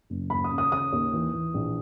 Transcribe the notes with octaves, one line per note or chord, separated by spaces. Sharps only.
F#1
D#2 B5
D#6
C#3
D#6
C#3 D#6
D#2
E3
E3
A#1